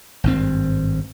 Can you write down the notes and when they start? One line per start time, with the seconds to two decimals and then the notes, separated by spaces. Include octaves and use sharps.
0.24 G#1 G2 C4